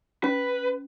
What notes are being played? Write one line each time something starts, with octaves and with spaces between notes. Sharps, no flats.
C#4 B4